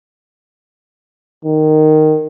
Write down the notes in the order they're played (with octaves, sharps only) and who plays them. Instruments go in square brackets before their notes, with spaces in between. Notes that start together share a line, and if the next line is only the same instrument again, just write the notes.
[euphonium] D#3